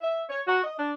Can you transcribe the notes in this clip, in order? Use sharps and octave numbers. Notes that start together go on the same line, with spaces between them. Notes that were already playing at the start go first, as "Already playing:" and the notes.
E5
C#5
F#4
D#5
D4